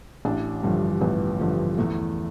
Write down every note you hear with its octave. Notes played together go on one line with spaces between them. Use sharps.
A1 D4
G2 D3 F3
A1 B3
G2 D3 F3
E2 A3